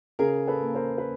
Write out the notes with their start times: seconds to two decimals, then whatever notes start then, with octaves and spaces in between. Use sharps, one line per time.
0.19 C#3 G#4 A#4
0.47 A4 B4
0.61 A#3
0.75 A#4 C5
0.98 B4